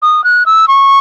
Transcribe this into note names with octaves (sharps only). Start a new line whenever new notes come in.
D#6
F#6
E6
C#6